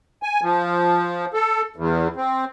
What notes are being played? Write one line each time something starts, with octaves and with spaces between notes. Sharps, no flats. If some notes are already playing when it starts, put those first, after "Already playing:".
G#5
F3
A4
E2
C4